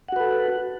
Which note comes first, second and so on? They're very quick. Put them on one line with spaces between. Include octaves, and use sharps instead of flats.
F#5 F#4 B4 A4